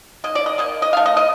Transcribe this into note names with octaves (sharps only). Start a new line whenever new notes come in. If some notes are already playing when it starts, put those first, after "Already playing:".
D#3 A#3 D#5
D5
D#5
D#3 A#3 D#5
D#5
D#3 A3 F5
D#5
D#5